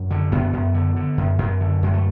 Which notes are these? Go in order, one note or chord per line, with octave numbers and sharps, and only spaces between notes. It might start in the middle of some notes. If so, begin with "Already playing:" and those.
Already playing: F#2
D3
F#2 B3
F#2
D3
D3
F#2
F#2
D3
F#2 G#3
A3